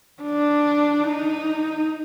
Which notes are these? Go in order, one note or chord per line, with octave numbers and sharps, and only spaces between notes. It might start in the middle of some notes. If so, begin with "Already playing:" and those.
D4
D#4